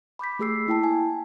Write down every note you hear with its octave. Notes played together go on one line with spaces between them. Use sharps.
B5 D6 G6 B6
A3 G4 G#4 E6 C7
A#3 E4 G5 A5
G#5